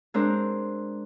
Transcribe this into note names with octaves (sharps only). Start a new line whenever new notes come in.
G#3 C4 D4 A#4 C5